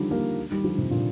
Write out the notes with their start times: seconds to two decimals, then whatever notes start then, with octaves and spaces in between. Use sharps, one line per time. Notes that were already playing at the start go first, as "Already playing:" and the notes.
Already playing: D3 D#3 F3 G3
0.11 G3 A#3
0.51 D#3 G3
0.64 D3 F3
0.77 C3 D#3
0.91 A#2 D3